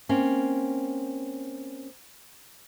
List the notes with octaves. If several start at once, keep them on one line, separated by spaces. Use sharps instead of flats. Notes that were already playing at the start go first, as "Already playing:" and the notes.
A#3 C4 C#4